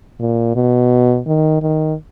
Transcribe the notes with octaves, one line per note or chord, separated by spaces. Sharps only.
A#2
B2
D#3
D#3